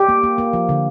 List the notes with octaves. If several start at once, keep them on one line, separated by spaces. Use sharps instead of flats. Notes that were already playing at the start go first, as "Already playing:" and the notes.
Already playing: G4
A#3
A#3
A#3
F3
D3